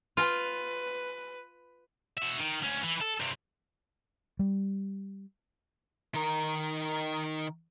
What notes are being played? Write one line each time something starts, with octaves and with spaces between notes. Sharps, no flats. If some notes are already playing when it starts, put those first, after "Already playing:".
F4 B4
F#4 E5
D#3
D2 C#4
E3
A4
G2 C3
G3
D#3 A#4